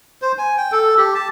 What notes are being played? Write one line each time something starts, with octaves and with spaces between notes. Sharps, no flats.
C5
G#5
G5
A4
G4
A5